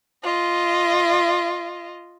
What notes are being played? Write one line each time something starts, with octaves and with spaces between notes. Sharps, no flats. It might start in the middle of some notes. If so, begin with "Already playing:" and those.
F4 D#5